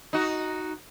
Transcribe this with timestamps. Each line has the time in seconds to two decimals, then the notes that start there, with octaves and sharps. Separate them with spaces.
0.13 D#4 F#4